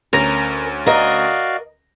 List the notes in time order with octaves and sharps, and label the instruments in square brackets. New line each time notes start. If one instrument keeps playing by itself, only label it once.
[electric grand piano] D2 C#4 A#6 [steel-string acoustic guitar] A#4
[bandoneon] F#4 D5 F5 [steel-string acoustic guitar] A#4 D#5